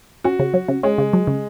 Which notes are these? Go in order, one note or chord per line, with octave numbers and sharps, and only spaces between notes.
C#4 F#4
C#3
F#3
C#3
G#3 C#4
C#3
F#3
C#3